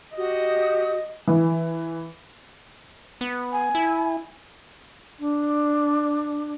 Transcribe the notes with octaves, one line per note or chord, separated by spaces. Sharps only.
F#4 G4 D#5 D#6
E3
B3
G#5
E4
D4